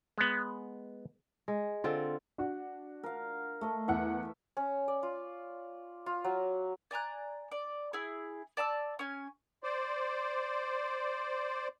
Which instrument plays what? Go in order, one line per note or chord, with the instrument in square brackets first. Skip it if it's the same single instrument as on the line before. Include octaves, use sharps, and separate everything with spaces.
[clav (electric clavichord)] G#3 B3
[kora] G#3
D3 C4 F4
[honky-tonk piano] D4 F#4
[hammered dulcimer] A#4 F5
A3 D#5
[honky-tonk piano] E2 F#5 [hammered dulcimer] E5
[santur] C#4
D5
F4
F4
F#3
[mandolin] D5 G#5 A#5 F#6
D5
E4 G#4
D5 A5 A#5 E6
C#4 G#5
[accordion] C5 D5